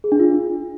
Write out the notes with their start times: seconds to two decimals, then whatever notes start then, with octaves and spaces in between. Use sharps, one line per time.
0.04 G#4
0.12 D4
0.20 F4